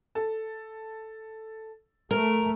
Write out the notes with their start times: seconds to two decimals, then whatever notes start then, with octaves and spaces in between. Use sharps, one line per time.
0.15 A4
2.11 A3 A#4